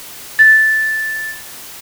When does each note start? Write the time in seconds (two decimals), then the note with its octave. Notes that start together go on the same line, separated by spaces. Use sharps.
0.39 A6